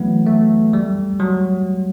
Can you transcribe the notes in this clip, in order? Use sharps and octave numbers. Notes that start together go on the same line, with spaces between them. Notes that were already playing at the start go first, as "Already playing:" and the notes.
Already playing: E3 F#3 A3 B3
A3
G3
F#3